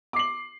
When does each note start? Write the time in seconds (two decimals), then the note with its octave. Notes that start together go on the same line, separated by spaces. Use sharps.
0.13 D6
0.16 C7
0.19 F#7